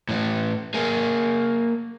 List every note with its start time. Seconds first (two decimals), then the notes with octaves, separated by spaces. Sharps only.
0.09 A2 E3
0.74 A#3 G#4